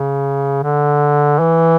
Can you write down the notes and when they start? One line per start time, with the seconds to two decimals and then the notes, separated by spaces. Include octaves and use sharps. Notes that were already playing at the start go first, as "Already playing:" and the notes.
Already playing: C#3
0.63 D3
1.39 E3